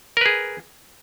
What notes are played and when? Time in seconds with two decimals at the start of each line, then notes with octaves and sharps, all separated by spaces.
0.17 A#4
0.21 B4
0.26 G#4